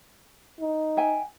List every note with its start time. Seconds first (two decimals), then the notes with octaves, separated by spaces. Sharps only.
0.60 D#4
0.97 E5 G5 G#5